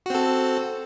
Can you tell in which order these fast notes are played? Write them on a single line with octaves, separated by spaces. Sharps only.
F#4 C4 A4